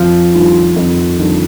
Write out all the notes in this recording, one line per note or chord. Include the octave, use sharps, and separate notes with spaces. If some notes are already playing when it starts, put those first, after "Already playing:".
Already playing: F2 F3
D#3 G3 D4 F4
F2
D#3 G3 D4 F4